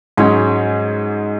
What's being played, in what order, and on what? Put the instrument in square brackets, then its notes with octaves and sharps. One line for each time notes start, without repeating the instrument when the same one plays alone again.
[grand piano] G#2 F#3 C#4 [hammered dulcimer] G#3